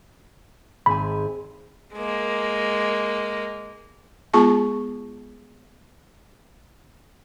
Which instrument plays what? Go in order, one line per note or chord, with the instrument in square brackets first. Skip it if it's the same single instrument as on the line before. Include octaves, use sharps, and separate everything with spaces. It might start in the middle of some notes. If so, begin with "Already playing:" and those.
[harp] G#1 C4 G#5 [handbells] B5
[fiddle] G#3 A#3
[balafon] G#3 B3 F4 G#4 A5 C#6